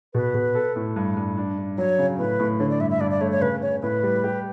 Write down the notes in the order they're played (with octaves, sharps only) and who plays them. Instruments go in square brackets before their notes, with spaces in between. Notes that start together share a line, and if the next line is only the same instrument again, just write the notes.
[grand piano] B2 [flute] B4
[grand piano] B2
A4
A2
G2
G2
D4
D4
[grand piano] F#3 [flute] C#5
[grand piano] C#3
[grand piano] A2 [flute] B4
[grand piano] A2
[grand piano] D3 [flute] C#5
[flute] D5
[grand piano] G2 [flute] E5
[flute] E5
[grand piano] G2 [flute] D5
[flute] D5
[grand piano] A3 [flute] C#5
[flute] C#5
[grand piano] C#3 [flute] B4
[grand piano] C#3 [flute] C#5
[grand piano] A2 [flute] B4
[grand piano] G3
G4